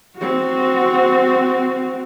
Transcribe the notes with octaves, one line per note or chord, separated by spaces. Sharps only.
C4 F#4